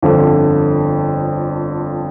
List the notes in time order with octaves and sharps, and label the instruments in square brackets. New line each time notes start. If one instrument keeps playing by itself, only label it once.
[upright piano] G1 F2 D3 F3